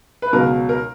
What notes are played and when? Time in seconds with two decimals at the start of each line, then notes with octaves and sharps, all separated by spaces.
0.22 B4
0.33 C#2 B2 F#3 A#4
0.69 A#4